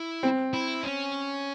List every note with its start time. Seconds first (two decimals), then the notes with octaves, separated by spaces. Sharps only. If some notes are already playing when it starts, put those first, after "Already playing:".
Already playing: E4
0.23 C4
0.53 E4
0.84 C#4